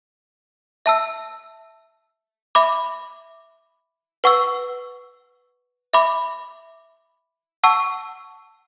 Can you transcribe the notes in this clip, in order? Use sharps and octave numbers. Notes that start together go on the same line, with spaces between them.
E5 A5 E6
E5 B5 D6
B4 F#5 C#6 E6
E5 B5 D6
F#5 A5 C#6 E6